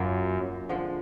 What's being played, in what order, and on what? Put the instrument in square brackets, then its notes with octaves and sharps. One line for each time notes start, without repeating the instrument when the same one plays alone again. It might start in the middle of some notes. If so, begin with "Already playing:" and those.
Already playing: [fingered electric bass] F#2 [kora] F#3 A#3 C#4 F4
[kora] D3 F3 G#3